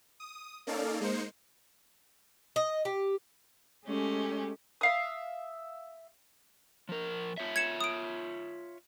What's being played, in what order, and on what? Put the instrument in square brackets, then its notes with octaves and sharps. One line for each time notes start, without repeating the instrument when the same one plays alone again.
[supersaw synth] D#6
A#3 C#4 D#4 A4 D5 F5
G#3 A#3 D#4 C5 C#7
[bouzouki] D#5
G4
[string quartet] G#3 A3 C#4 G4
[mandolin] E5 F5 D#6
[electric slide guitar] F3 A#4
F4 C#5 E5
[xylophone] G#6 C#7 E7
D#6 D7